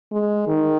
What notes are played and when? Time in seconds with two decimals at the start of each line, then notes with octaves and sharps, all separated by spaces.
0.12 G#3
0.48 D#3